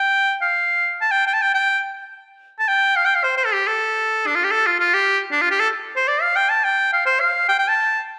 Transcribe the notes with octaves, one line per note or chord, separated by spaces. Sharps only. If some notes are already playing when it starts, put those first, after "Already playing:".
Already playing: G5
F5
A5
G5
G5
A5
G5
G5
A5
G5
F5
G5
F5
C5
C5
A4
G4
A4
D4
F4
G4
A4
F4
F4
G4
D4
F4
G4
A4
C5
D5
F5
G5
A5
G5
F5
C5
F5
G5
G5
A5